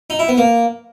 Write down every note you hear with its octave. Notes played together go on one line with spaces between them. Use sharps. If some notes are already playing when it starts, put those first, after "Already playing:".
D#4
E4
B3
A#3